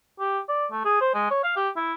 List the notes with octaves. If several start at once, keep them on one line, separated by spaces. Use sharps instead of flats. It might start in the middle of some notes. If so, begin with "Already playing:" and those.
G4
D5
A3
G#4
C5
G#3
C#5
F5
G4
E4